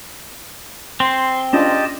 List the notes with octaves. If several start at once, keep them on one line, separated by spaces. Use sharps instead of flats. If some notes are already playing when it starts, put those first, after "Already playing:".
C4 C6
C#4 D4 F4 G4 D#5 A5